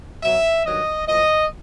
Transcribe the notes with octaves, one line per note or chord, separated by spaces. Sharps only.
B2 F#3 E5
G2 D#3 F#3 D#5
A2 F3 D#5